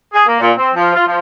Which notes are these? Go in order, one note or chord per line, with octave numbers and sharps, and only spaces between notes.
G#4
A#3
A#2
C4
F3
F4
F3